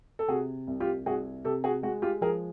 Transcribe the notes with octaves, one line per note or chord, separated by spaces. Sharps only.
A4
C3 F#4 G#4
C2
F4 G4
C2 F#4 G#4
C3 G4 A4
F#4 G#4
G#3 F#4
F4 G4
F3 G#4 A#4